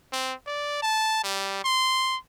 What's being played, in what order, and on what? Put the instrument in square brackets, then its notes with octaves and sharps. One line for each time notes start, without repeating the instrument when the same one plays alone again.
[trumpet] C4
D5
A5
G3
C6